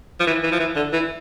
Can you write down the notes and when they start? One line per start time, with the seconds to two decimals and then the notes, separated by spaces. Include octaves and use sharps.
0.20 F3
0.27 E3
0.43 E3
0.52 F3
0.60 E3
0.76 D3
0.93 E3